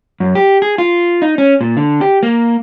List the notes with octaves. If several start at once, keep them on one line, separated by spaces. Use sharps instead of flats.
F#2
G4
G#4
F4
D#4
C#4
A#2
D3
G4
A#3